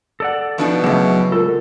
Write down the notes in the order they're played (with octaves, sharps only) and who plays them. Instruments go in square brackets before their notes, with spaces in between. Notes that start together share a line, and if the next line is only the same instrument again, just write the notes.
[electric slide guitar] A4 D5 F#5
[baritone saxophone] B2 [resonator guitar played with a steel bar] F3 D4 D#4
[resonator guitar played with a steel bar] C#3 A3 [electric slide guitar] F#3 B3 E4 [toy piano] G#4 D#5
[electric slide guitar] G#3 A4 [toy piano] F4 A#4